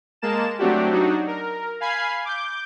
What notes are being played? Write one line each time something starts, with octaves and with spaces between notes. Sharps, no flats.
G#3 A#3 A5 E7
F#3 A3 C4 D4 F#4 G4
F#3 D4 D#4 F#4
A#4
F5 G#5 B5 G#6 C7
D6 G6